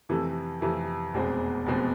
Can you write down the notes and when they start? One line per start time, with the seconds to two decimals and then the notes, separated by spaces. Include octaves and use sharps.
0.09 F2 C3 E3 A3
0.61 F2 C3 E3 A3
1.14 F1 E2 B2 G#3 C4
1.66 F1 E2 B2 G#3 C4